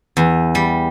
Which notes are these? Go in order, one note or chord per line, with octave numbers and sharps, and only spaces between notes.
E2
G3